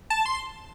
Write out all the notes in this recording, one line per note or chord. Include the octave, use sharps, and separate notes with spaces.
A5
C6